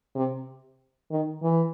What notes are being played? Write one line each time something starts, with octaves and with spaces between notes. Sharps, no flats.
C3
D#3
E3